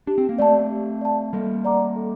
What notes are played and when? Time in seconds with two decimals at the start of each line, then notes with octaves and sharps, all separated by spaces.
0.07 D4 G4
0.18 C4
0.29 A#3
0.38 A3 C4 D5 A5
0.70 G4
1.01 D5 A5
1.33 G3 A#3 A4
1.65 D5 F#5 A#5 D6
1.96 A4